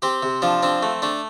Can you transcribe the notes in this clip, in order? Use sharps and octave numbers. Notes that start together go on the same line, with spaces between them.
C4 G4
C3
F3 D4
C4 D4
A3
A3 D4